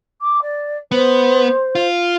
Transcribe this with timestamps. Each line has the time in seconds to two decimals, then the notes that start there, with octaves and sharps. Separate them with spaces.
0.21 D6
0.42 D5
0.92 B3 C5
1.75 F4